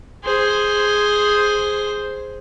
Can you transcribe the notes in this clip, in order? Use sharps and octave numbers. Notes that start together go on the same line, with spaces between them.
G#4 C5